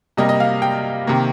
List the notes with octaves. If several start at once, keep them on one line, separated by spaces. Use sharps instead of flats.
C3 G3 A#3 D#5
D#5
F5
G5
C3 D#3 A#3